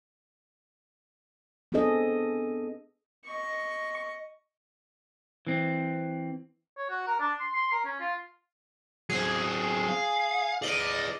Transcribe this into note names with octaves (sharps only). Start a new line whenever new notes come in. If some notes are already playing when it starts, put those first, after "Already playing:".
B3 C4 D4 G#4 A4 D#5
D#5 C#6
E3 C4
C#5
F#4
A#4
D4
C6
C6
A#4
C#4
F4
F#3 C4 G#4
F5
G#4 B4 D5 D#5